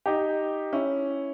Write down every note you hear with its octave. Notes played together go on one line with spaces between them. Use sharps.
D#4 G4
C#4 E4